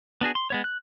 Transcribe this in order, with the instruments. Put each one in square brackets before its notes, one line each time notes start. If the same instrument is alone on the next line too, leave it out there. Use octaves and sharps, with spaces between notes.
[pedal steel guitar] B3 D4 F#4 G#4
C6
G#3 B3 C#5
F#6